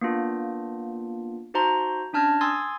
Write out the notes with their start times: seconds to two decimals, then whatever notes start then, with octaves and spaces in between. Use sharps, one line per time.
0.01 A#3 B3 D4 F4
1.54 D#4 F#4 C5 A5 A#5 C6
2.13 C#4 D4 A5 F6 G#6 A#6
2.41 G#5 C6 D#6 E6 G#6 A6